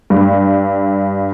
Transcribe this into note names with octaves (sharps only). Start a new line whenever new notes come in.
G2